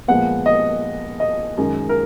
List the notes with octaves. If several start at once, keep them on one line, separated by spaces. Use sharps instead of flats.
A#2 F3 G#3 B3 F#5
D#5
D#5
F#2 D#3 G#3
A#4